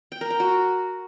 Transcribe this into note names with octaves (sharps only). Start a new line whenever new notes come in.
G5
A#4
G5
F#4